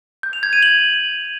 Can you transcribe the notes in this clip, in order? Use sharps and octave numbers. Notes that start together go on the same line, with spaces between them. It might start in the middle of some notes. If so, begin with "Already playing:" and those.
G6
F7
G#6
D#7
F#7